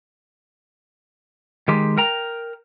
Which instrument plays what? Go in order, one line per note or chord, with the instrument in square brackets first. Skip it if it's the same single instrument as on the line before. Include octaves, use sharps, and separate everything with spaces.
[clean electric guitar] D#3 G#3 G4
A#4 G5 A#5